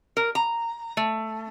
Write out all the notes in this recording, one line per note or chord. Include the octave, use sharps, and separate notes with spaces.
A#4
A#5
A3